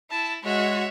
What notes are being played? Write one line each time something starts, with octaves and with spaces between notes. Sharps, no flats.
E4 A5
G#3 F#4 C#5 E5